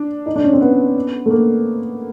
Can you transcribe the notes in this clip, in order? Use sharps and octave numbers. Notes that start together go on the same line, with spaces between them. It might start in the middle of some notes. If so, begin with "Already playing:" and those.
Already playing: D4
D#4
D4
C#4
C4
B3
A3
A#3